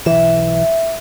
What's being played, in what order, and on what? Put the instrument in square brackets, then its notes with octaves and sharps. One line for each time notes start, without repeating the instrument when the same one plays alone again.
[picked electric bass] B1 E3 [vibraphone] E5